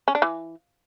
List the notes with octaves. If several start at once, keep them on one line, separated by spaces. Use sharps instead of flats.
C#4
D4
E3